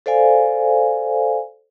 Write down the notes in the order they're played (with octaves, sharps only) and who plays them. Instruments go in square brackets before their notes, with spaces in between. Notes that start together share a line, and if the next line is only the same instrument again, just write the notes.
[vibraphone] A4 C5 D5 F5 G#5